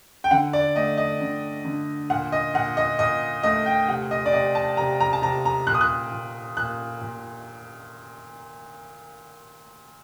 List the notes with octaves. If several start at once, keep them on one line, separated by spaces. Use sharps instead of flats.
G5
D3 F#5
D5
A3 D#5
D#5
D3
D3
A#2 F#5
D#5
A#2 F#5
D#5
A#2 D#5
A3 D#5
G5
C3 F#5
D#5
D5
C3 D#5
A5
C3 A#5
A#5
A5
C3 A#5
A#5
A#2 F#6
D#6
F#6
A#2
A#2 F#6
A#2